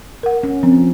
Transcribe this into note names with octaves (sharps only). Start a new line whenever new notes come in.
A#4 F#5
C#4
F3 C4